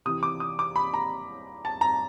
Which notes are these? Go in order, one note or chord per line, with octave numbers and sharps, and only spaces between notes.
C3 E3 D#6
D6
D#6
D6
B5
A#5
A5
A#5